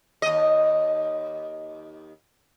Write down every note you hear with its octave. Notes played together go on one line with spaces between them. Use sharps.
D#2 D#5